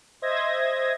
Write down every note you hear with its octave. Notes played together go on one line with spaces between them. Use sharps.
C5 D#5 E5 G#6 A#6